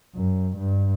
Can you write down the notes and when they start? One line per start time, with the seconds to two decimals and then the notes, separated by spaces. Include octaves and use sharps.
0.15 F#2
0.57 G2